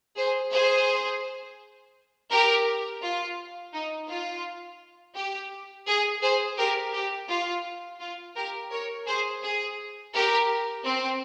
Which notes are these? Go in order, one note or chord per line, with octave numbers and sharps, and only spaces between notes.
G#4 C5
G#4 C5
G4 A#4
F4
D#4
F4
G4
G#4
G#4 C5
G4 A#4
G4
F4
F4
G4 A#4
A#4 C#5
G#4 C5
G#4
G4 A#4
C4